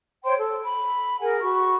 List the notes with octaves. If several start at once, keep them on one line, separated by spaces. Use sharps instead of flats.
C5 C#5 G5 C6
A4
B5
G#4 A#4 F#5 G#5
F#4 B5 C#6